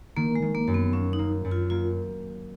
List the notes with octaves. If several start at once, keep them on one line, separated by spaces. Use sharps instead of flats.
D#3 A#3
G#3
D#3
A#3
F#2
B3
A#3 C#4
D#4
A#3
F#2
F4
A#3 F4